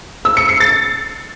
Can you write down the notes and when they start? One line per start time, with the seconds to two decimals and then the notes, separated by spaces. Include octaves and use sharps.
0.25 E6
0.37 C#7
0.49 C7
0.60 A6